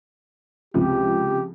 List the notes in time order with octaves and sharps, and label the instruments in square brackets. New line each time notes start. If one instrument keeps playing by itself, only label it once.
[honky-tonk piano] C#2 C3 F3 [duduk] G4